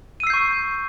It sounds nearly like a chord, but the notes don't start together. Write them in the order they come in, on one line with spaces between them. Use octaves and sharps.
D#7 E6 C7 G6 C#6